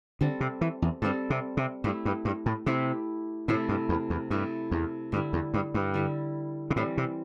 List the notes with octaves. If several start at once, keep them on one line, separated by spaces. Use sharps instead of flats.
D3 G3 C4 A4
C3
E3
E2
G2 G3 C4 A4
C3
C3
G2 A3 E4 G4
G2
G2
A2
C3 A3 E4 G4
A2 C3 A3 E4 A4
G2
E2
E2
G2 C3 A3 E4 A4
E2
G2 D3 G3 E4
E2
G2
G2
D3 G3 E4
C3
A2 E3 G3 C4
C3